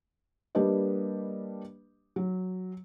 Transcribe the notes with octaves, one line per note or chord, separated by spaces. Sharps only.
G3 A#3 D4 G4 B4 D#5
F#3